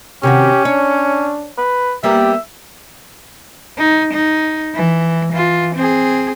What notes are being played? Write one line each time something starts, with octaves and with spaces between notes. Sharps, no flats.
C3 D#3 C#4 F#4 G4
D4 C#5
B4
G3 A#3 B3 G4 E5
D#4
D#4
E3
E3 F4
C4 G#4